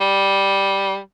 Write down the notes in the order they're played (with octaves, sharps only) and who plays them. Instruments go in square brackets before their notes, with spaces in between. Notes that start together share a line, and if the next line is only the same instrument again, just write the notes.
[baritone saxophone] G3